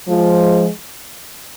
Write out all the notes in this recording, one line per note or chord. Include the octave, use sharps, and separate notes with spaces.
F3 G#3